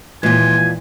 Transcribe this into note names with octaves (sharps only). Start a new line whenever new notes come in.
D#2 A#2 E3 G#3 F4 G#5